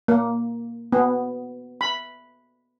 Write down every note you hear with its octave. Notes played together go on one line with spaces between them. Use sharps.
A#3
B3
B5